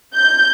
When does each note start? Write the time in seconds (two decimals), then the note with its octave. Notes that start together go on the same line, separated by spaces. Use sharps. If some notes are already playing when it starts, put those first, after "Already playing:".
0.15 G6